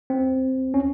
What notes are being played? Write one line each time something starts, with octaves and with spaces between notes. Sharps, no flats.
C4
C#4